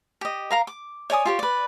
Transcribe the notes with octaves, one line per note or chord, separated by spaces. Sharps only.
G4 D#5
A#4 F5 A#5
D6
C#5 D5 G#5 D#6
F4 G4 C#5
B4 D5